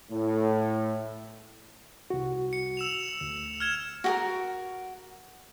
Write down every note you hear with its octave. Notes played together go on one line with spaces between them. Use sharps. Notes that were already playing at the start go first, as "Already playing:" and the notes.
A2
C2 F#4
C#7
E6 E7 F7
D2
F6 G#6 E7
F#4 G4 A#4